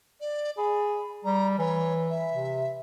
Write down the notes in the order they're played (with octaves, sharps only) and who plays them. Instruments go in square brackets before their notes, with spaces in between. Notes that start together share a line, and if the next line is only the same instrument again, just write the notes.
[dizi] D5
[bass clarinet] G#4 [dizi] B5
[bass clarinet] G3 [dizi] A#5
[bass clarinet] E3 [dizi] C#5
[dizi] E5
[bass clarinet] C3